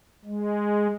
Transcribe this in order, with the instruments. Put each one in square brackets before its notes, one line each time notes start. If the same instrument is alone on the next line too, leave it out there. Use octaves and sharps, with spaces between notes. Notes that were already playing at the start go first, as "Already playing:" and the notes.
[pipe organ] G#3